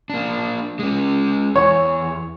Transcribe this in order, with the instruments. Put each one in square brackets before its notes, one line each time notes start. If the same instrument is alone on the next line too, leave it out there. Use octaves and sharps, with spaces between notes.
[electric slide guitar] A#3 D4
G#3 C#4
[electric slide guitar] E2 [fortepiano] C#5